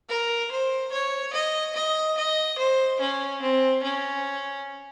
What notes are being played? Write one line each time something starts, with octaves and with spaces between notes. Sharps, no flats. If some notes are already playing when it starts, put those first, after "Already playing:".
A#4
C5
C#5
D#5
D#5
D#5
C5
C#4
C4
C#4